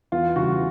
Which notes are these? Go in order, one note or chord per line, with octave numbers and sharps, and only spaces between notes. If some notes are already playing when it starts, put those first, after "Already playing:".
E2 F4
C#3 E3 G3 F#4